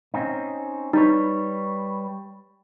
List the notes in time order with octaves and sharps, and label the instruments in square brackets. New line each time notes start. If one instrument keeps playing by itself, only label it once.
[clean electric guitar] C4 C#4 D#4
[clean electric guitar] G3 B4 C#5 [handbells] D#4